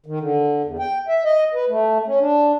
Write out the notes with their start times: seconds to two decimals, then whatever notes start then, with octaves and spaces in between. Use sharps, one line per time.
0.06 D#3
0.20 D3
0.64 E2
0.79 G5
1.08 E5
1.24 D#5
1.54 B4
1.69 A3
2.07 C#4
2.20 D4